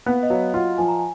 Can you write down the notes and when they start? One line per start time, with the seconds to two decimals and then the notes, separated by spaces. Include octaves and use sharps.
0.06 B3 F5
0.23 D#5
0.30 F#3 F5
0.54 F4 F#5
0.78 F3 G#5
0.88 A#5
0.99 G#5